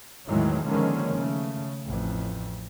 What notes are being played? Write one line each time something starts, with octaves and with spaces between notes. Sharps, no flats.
E2 A2 D#3 E3 F#3 G#3
D3 D#3 F3 G#3 A#3 C#4
C#3 A3
A1 F2